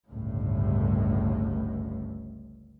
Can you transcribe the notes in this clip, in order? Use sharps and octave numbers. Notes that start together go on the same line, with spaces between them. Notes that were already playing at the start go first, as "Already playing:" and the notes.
G1 C#2 A2